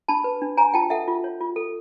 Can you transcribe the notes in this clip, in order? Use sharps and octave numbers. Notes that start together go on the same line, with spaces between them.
D4 A5 B5
B4
D4
C#5 G#5 A#5
F4 G5 A5
A4 E5 F#5
F4
C#5
F4
A4